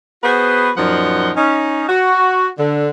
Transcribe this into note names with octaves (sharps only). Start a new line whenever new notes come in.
B3 F#4 G#4 B4 C5
F#2 A#2 F3 D#4 F#5
C#4 D#4
F#4
D3